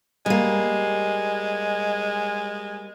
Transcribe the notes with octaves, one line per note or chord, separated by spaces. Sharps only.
G3 G#3 A#3